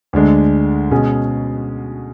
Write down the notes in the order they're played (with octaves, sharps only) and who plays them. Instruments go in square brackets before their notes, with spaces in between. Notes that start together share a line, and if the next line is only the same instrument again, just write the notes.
[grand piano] D2 D3 G#3 D4
B2 G#3 C#4 G#4